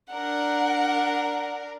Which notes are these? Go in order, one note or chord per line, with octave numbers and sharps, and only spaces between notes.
D4 A#4 F#5